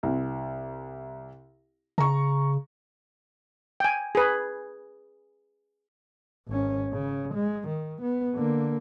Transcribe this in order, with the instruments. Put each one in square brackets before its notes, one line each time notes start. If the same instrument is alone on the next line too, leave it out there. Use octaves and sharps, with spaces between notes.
[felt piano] C2
[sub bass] C#3 [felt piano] A#5 C#6
[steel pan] G5 G#5
G#4 B4
[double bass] G#1 C#4
C#3
G#3
D#3
B3
D3 A#3